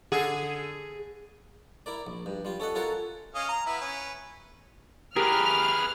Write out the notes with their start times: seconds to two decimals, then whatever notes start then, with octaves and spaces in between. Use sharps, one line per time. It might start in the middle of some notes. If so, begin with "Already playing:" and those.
0.12 D3 G#4
1.86 E4 A#4 D5
2.07 A#1
2.26 G2
2.45 G3 F4
2.60 C#4 A4 D#5 F#5
2.75 C#4 F4 F#4 A4 A#4 C#5
3.35 C#4 D#5 F5
3.49 A#5
3.66 B3 E4 B4
3.81 C#4 B4
5.16 G4 G#4 A#4 B4 F6